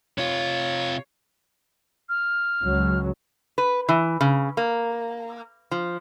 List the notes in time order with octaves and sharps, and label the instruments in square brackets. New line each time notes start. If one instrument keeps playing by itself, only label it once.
[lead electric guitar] C3 F4 [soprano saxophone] C#5
[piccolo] F6
[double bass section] C#2 F#3
[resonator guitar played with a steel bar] B4
E3
C#3
A#3
F3